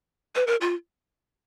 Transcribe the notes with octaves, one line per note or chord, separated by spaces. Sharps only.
B4
A#4
F4